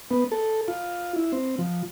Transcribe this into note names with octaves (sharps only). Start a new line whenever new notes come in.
B3
A4
F4
E4
C4
F3